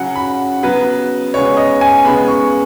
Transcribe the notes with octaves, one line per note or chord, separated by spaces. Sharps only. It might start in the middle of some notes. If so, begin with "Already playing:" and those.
Already playing: C#3 F#3 C#4 F#5
B5
C#3 F#3 B3 B4
C#3 G#3 B3 C#5
D#5
G#5
C#3 G#3 B3 B5
C#6